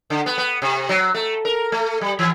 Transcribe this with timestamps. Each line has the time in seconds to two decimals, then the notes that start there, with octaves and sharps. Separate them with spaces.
0.10 D3
0.26 B3
0.38 B3
0.62 C3
0.89 F#3
1.14 A3
1.45 A#4
1.72 A3
2.01 G3
2.19 E3